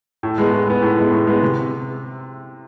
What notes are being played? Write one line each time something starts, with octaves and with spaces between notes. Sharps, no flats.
A2
G#3 B3
A2
G#3 B3
A2
G#3 B3
A2
G#3 B3
C3